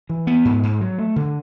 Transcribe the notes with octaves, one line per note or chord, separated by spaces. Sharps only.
E3
B3
G#2
G#2
F#3
A3
D3